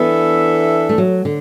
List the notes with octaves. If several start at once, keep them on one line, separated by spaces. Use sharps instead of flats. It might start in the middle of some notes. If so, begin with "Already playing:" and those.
Already playing: E3 B3 D4 A4 E5
A3
F#3
D3